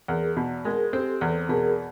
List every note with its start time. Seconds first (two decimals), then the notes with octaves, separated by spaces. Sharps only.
0.08 E2 G#4 A#4
0.37 B2
0.65 G#3 G#4 A#4
0.93 C4 G4 A4
1.21 E2 A4 B4
1.49 B2 G#4 A#4